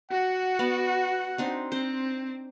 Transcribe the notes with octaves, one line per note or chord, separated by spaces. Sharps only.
F#4 F#5
B3 D5
C4 D4 D#4
C4 C5